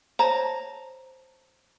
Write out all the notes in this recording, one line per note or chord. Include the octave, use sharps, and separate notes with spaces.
C5 C#5 A5 A#5